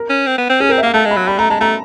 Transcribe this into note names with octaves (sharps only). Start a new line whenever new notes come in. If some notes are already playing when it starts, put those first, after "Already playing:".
Already playing: A#4
C#4
C4
B3
C4
C#4 G#4
A#4
C4
E5
A#3 F5
A3 A5
G#3
B5
F#3
G3 B5
A3 A#5
G#3 A5
A3 A#5